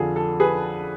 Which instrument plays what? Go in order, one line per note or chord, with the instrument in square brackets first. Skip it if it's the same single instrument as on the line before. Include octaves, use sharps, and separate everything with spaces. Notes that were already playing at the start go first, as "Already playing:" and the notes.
Already playing: [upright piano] F2 D3 F3 G#4 A4
A4
G#4 B4